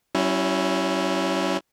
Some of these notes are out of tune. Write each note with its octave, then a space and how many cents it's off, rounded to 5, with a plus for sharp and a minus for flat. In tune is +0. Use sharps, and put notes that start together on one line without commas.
F#3 +45 C#4 +0 E4 +0